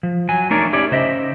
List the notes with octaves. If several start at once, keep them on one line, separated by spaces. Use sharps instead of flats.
F3
F#3 G#5
A3 D4 D#4 A#4 C#5 D5
C#4 E4 G4 C#5 D5
C#3 C5 D#5 E5